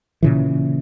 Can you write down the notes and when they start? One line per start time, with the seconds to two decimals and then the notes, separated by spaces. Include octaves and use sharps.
0.23 A#2 C#3 E3